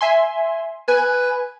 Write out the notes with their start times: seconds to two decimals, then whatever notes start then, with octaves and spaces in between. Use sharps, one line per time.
0.01 E5 G#5 C6
0.88 B4 G#5